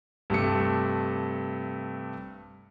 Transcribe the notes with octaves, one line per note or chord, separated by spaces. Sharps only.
G2 C3 A3 C#7